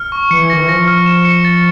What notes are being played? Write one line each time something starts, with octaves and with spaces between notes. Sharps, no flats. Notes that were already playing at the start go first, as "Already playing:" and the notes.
Already playing: F6
C#6
E3 C#7
D#3 A#6
E3
F3 A#6
F6
E7
C#7
A6